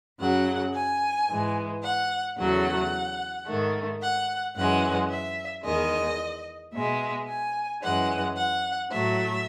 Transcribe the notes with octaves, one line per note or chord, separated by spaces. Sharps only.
F#2 C#3 F#3 F#5
G#5
G#2 E3 G#3
F#5
E2 C#3 F#3 A3 F#5
G#2 D#3 A3
F#5
F#2 E3 G#3 F#5
E5
E2 D#3 G#3 D#5
B2 G#3 E5
G#5
F#2 E3 G#3 F#5
F#5
A2 F#3 A3 E5